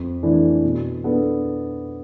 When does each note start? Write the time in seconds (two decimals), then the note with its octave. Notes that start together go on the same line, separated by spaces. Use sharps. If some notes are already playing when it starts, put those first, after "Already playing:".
Already playing: F2
0.23 E3 A3 D4
0.63 B2
1.04 B3 D4 A4